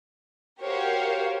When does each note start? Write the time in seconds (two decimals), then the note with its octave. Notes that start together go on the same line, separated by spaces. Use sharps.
0.62 F#4 G4 A#4 C5 C#5 F5